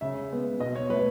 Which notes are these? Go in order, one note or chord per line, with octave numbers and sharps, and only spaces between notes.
C#3 E5
G#3 B3
B2 D#5
C#5
F#3 A3 B4